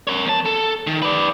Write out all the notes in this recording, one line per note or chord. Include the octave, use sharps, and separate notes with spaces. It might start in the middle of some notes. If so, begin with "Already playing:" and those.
A#4 C#5
E2 A5
A4
D#3
B4 D5